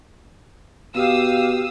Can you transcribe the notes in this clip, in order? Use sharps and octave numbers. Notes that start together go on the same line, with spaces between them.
B2 G4 F5 D#6 E6